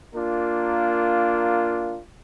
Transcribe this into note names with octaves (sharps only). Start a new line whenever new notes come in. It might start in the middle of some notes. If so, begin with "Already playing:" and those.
A#3 D4 F4 A#4